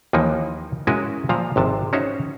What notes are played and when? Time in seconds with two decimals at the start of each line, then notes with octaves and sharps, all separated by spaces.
0.13 D#2 E3 F3 A#3 D#4
0.87 G#3 C#4 E4 F#4 A#4 G#5
1.29 A#2 F3 F5 A#5
1.56 G#1 C3 A5
1.93 C#4 D#4 F#4 C5 C#5 E5